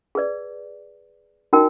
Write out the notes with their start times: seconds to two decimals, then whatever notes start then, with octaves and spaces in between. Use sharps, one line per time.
0.15 G#4 B4 D5
1.53 D#4 F#4 A#4 D#5 G5